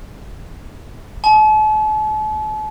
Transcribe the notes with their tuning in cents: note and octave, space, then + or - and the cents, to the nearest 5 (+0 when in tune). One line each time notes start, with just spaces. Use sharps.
A5 -40